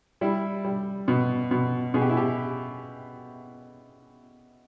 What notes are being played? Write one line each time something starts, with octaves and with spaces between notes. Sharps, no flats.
G3 E4
G3
B2
B2
B2 G#4
G4
E4
G4